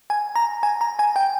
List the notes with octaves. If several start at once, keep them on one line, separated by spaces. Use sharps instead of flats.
G#5
A#5
G#5
A#5
G#5
G5